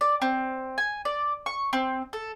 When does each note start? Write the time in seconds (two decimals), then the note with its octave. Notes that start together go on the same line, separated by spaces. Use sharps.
0.01 D5
0.22 C4
0.78 G#5
1.05 D5
1.46 C#6
1.73 C4
2.13 A4